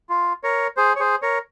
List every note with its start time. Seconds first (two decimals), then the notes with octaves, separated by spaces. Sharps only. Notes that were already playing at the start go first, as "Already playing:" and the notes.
0.09 F4
0.43 A#4 C#5
0.77 G#4 C5
0.96 C#5
1.00 G#4 C5
1.22 A#4 C#5